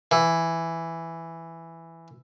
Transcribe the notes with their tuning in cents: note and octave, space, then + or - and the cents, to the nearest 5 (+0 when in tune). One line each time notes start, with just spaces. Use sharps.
E3 +5